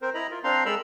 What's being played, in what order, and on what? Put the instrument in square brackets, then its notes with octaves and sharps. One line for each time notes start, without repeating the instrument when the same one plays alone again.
[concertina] C4 A#4 C5
E4 D#5 A#5 B5
F4 A#4
C4 D4 F5 A#5 C6
G#3 A4 A#4 A#5 B5 E6